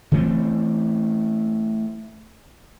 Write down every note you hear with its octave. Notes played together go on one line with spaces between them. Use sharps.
E3 A3 C4